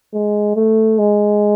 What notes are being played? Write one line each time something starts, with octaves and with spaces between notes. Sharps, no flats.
G#3
A3
G#3